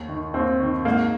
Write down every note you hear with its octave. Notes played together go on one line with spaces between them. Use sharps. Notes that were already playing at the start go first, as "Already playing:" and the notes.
Already playing: D#2
D#3
D#2 C4
D#3
G#2 A#3